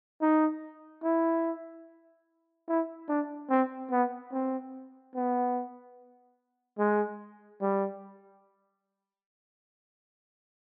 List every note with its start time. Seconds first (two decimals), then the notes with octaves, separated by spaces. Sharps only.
0.22 D#4
1.04 E4
2.69 E4
3.09 D4
3.50 C4
3.91 B3
4.33 C4
5.15 B3
6.79 G#3
7.62 G3